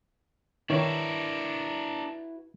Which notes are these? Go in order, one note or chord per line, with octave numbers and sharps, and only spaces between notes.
D#3 D4 E4 F#4 A#4 B4 C#5